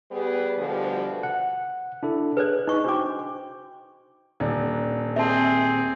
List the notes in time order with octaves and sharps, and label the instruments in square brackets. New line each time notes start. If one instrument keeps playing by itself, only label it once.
[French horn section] G3 B3 G#4 B4
D2 B2 D3 F3 G3
[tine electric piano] F#5
D4 E4 A4
[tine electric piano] G#4 F#6 [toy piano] B4 D5
[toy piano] D#4 C#6 [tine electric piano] D#5
[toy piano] D4 F#4 D6 [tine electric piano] C5 G5
[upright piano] D#1 D4
[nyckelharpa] C4 G#4 [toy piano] E5 A5